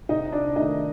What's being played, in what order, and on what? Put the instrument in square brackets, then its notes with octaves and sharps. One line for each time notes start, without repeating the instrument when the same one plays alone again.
[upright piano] C3 D#4 D#5
D4 D5
D#3 A3 D#4 D#5